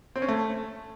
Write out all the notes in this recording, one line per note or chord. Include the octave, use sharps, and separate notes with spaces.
C4
C#4
A3